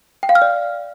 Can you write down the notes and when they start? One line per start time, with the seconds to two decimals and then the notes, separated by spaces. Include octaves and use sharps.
0.23 G5
0.29 F5
0.35 F6
0.42 D5